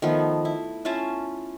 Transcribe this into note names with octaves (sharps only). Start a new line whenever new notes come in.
D#3 F3 A3 B3
E4
C#4 E4 F4 A5